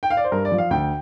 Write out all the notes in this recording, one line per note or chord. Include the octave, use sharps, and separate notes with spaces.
G5
F5
D5
C5
G2 A#4
D5
F3
F5
D2 G5